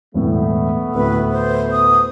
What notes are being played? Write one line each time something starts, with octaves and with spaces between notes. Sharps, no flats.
E1 A2 A3 B3
D2 A2 B4
C5
D#6